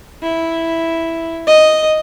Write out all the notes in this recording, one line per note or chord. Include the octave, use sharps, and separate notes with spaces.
E4
D#5